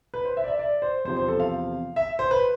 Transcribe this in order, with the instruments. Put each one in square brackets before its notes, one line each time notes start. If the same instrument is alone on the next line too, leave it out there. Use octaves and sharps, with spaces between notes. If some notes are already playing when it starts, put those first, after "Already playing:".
[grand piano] B4
C5
E5
D5
E5
D5
C5
E2 C3 F3 C5
C5
A4
F5
E5
C5
B4